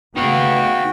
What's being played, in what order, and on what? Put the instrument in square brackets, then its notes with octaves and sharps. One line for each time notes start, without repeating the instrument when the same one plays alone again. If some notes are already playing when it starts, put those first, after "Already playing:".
[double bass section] C#3 A3 B3 [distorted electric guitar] D#4 F5 [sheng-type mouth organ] F#4 G5